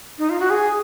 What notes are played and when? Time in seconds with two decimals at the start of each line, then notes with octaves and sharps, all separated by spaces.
0.18 D#4
0.30 F4
0.40 F#4
0.50 G#4